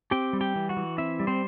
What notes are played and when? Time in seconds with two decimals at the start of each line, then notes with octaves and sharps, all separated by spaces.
0.11 C4 G4 G5
0.33 G3
0.41 G4 G5
0.56 E3
0.69 F#4 F#5
0.77 E3
0.98 C4 E4 E5
1.20 G3
1.27 C4 C5